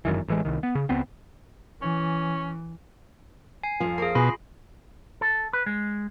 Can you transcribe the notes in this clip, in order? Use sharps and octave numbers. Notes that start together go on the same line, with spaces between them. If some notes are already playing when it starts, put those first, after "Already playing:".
G1 F#2 D#3 E3
A1 E3 G#3
C2 D#3
B3
C#3
C#2 B3 C4
E3 C#4
G#5 C7
F2 F3
A#3 G#4 C7
B2 F4 G#4 B5
A4
B4
G#3